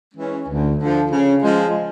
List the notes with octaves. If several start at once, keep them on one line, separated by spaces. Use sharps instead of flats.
E3 G#3 C#4
D2
D3 F3
C#3
F3 G#3